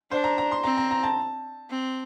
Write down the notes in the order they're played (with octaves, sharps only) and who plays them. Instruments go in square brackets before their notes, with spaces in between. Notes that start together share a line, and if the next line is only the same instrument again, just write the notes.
[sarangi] D4 [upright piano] C5
[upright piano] A#5
A#5
C6
[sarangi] C4 [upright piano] A#5
[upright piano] A#5
A#5
A5
[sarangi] C4